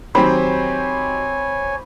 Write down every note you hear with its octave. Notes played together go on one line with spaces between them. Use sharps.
D#3 F#3 C4 G4 C5 C#5 G#5 B5